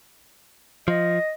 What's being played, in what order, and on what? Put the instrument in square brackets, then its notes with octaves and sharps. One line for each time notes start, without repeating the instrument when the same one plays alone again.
[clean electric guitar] F3 [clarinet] D#5